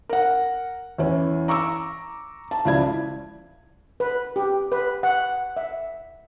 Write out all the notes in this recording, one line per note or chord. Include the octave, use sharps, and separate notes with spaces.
A#4 F#5
E2 E3 C#4
A#5 C#6 D6 E6
A5
C#2 F3 E4 D5 G#6
B4
G4
B4
F#5
E5